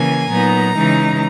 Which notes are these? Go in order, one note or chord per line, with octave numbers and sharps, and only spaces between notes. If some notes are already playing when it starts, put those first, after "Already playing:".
Already playing: C#3 E3 A#3 G#5
A#2 F#3 B3 D#4 A#5
C#3 E3 G#3 D#4